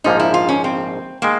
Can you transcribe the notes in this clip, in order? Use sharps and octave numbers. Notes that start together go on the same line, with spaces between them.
A#1 G#2 F3 A#3 D#4
E4
F4
C#4
C4
D#3 G#3 A#3